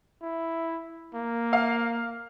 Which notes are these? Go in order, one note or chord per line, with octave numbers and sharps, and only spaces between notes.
E4
A#3
F5